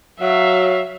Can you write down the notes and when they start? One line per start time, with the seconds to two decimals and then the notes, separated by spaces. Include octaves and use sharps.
0.21 F#3 E5 F5